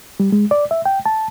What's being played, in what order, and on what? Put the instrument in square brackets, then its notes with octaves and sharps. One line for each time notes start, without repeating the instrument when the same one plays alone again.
[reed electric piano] G3
G#3
D5
E5
G5
A5